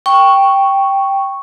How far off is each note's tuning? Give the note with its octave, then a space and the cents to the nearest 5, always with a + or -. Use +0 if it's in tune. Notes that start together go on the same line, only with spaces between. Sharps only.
G5 +0 C#6 +0